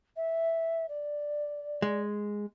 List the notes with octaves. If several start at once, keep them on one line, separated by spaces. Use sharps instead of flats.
E5
D5
G#3